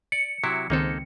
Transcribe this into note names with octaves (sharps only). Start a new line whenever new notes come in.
D5 C#7
C3 F#3 E4
C#2 D#3 A#3 C4 D#4 A4